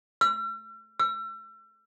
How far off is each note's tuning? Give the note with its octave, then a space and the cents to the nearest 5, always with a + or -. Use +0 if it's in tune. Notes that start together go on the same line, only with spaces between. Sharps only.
E6 +45
E6 +35